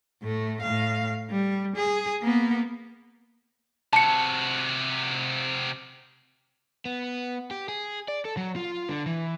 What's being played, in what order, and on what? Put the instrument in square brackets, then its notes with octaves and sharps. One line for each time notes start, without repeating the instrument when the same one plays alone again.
[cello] A2 A3
A2 F5
G3
G#4
A#3 B3
[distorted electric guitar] C3 F#4 [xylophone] A5 C#7
[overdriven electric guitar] B3
G4
G#4
D5
A4
F#3
F4
D3
E3